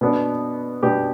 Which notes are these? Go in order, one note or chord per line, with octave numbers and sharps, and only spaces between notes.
B2 B3 D4
B2 B3 D4 G4